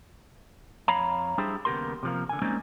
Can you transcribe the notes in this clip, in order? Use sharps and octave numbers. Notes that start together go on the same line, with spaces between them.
F2 C#5 F5 A#5 B5
G3 D4 E4 G4 G#4 C5
D#2 C#3 B3 G4 A#4 C6
C3 F3 A#3
D3 G#5
G3 G#3 A#3 C4 C#4 D#4